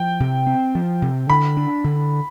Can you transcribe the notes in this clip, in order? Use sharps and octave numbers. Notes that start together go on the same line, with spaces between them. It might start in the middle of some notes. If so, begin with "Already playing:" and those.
Already playing: F3 G5
C3
C4
F3
C3
D3 B5
D4
D3